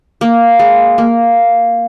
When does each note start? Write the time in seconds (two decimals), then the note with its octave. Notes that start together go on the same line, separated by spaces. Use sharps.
0.21 A#3
0.59 G#3
0.98 A#3